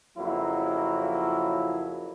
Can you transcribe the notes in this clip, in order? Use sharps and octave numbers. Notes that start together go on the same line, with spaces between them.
F2 C#3 F#3 A#3 E4